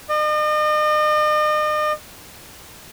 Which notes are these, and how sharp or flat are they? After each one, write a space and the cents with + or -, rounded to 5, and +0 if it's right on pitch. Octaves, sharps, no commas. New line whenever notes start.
D#5 -40